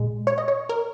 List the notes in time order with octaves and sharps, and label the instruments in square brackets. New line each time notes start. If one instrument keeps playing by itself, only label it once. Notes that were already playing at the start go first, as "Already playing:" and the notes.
Already playing: [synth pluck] A#2 G#3
C#5
D#5
C#5
A#4